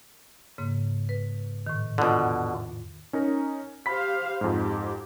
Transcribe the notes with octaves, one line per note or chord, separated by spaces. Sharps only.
G#2 C#3 A#3
B4
A2 D#3
E2 B2 D3 F4 E6
C#4 D#4 A#4
G4 C5 F5 B5 B6
F2 G#2 F#4 G4